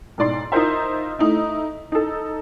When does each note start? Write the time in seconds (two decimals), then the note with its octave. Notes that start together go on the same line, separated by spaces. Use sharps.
0.18 B1 G#2 D5 C6
0.52 D#4 F4 A#4 C5 E5
1.19 A3 D#4 E4
1.92 D#4 A4